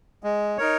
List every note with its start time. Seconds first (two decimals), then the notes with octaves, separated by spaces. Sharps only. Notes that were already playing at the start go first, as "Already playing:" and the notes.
0.24 G#3
0.57 D#4 A#4 C#5